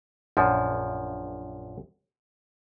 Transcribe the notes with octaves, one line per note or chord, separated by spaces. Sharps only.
A#1 F#2 F3